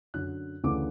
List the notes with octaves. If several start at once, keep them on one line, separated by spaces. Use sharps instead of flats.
F#2 D3 F#3 F#6
D2 C#3 E3 A3 D4 D6